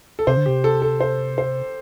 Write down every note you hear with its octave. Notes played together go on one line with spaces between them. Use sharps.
A4
C3 C5
D3
C3 G4
A4
A4
C5
C5